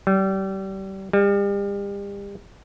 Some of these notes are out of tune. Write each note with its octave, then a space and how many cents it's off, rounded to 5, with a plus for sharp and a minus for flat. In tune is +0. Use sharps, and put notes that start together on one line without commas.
G3 -30
G3 +35